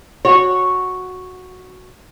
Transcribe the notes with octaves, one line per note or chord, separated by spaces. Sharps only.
F#4 C#5